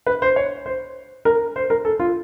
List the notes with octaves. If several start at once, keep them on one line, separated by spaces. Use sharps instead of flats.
B4
C5
C#5
C5
A#4
C5
A#4
A4
F4